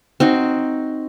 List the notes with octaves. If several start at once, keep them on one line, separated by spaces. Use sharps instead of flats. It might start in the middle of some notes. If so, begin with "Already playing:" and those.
C4 D#4 F#4